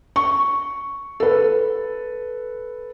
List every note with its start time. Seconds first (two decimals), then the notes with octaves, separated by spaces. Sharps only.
0.16 C#6
1.20 A4 B4